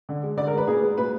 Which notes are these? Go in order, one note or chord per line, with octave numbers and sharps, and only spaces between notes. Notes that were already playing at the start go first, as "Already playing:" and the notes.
D3
G#3
D3 D5
A#4
G#3 B4
A#2 G#4
G#3
A#2 B4